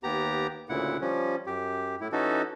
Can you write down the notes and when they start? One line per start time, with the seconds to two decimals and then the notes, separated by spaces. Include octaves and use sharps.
0.03 D#2 B3 G4 A#5
0.69 D2 A#2 C#3 E4 F#5
1.01 F3 G3 C#4
1.46 F#2 G4
2.01 A2 E4
2.12 E3 C#4 D#4 F#4 A4